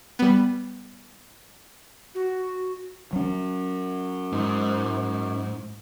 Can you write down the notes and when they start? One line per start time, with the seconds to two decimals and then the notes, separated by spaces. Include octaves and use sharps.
0.19 G3 B3
2.15 F#4
3.13 F#3 C#4
4.32 G#2